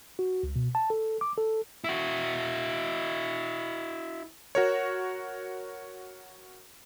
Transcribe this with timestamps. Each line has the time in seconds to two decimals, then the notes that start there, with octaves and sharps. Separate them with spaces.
0.19 F#4
0.43 C#2
0.56 B2
0.75 A5
0.90 A4
1.21 D6
1.37 A4
1.84 E4 F#4
4.55 F#4 A#4 C#5